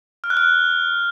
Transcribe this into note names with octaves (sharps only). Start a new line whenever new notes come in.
F6
F#6
F6